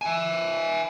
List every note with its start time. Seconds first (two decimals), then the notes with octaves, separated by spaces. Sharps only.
0.01 E5 G#5